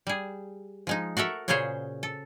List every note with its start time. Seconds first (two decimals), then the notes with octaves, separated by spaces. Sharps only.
0.07 G3 G#4
0.87 F3 G#3 D#4
1.17 F#4 A4 A#4 E5
1.48 A#2 C#3 C#4 G#4 C5 C#5
2.03 A4